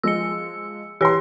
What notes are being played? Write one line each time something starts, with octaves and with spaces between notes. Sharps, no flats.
F3 G#3 E6 C#7
E3 G4 C#5 C6